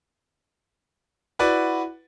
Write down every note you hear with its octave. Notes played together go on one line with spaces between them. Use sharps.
E4 F#4 B4 D5 F#5